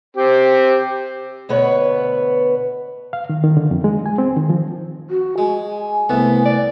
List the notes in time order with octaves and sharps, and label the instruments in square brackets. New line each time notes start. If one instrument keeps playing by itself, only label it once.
[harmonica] C4 G4
[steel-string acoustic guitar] D2 B2 B3 B4 C#5
[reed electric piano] F5
D#3
D#3
D3
F2
G#3
G#5
C4
D#3
F3
[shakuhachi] F#4
[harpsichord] G#3 [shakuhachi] G#5
[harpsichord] C2 A3 [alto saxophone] B3
[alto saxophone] D5